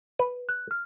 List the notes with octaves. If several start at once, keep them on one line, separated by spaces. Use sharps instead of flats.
B4
F#6
F6